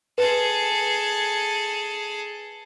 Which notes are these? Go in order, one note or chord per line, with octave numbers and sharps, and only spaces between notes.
G#4 A4 B4